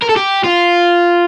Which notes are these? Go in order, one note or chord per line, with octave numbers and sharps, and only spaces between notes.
A#4
A4
G4
F4